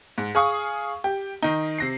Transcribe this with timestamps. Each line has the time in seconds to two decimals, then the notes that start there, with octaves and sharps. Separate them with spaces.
0.18 G#2
0.35 G#4 F5 C#6 D#6
1.04 G4
1.42 D#3 D#4
1.78 C3 A#6 C7